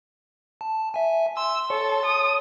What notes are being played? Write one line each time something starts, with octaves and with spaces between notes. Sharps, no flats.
A5
E5 G#5
C6 E6
A4 C#5
D#6